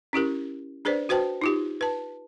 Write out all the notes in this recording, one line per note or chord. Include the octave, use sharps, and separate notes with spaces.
C#4 E4 G4 A#4
D4 G#4 B4 C5 D5
F#4 B4 C5 G5 A5
D#4 F4 G4
B4 A5